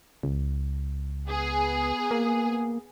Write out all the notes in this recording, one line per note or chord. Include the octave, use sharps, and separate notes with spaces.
C#2
B3 G#4
A#3